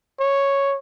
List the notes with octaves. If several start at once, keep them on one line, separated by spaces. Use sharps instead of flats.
C#5